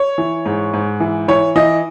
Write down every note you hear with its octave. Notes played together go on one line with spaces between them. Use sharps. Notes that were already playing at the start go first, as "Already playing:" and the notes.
Already playing: C#5
E3
G#2
G#2
E3
E3 C#5
E3 D#5